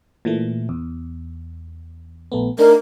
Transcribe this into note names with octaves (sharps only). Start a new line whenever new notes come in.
A#2 E3 A3
E2
A#1 A3 B3
A3 D4 D#4 A#4